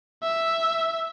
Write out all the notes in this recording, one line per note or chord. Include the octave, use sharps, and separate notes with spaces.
E5